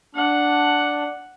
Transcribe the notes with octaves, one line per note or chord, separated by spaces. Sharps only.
D4 F#5